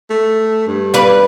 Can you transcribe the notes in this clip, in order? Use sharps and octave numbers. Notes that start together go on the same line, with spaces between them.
A3
G2
B4 D5 F5